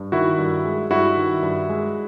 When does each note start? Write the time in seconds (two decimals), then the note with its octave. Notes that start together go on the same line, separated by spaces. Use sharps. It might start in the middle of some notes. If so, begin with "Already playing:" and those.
Already playing: G2
0.12 D#3 E4 F#4
0.38 G2
0.65 G#3
0.91 G2 E4 F#4
1.17 D#3
1.43 G2
1.69 G#3